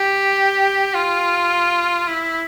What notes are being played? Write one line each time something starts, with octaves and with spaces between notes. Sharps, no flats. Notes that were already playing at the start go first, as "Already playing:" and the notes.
Already playing: G4
F4
E4